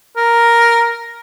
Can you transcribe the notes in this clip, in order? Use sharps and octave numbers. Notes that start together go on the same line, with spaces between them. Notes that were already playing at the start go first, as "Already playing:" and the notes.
A#4